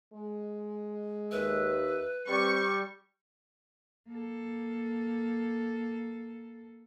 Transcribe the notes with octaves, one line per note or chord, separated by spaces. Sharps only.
G#3
D#2 B4 E5
G3 C4 C#6
A#3 A4